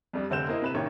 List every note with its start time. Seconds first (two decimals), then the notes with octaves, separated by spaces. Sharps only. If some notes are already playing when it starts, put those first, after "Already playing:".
0.13 F2 G3 D4
0.30 F1 D3 C4 G6 E7
0.48 A#3 E4 C5 D#5
0.62 C3 B4 E7
0.74 A1 D#3 A#3 C#5 G5